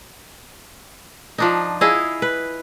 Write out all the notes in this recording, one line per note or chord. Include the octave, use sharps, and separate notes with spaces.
F3 D4 D#4
E4 G#4 D#5 F5
B4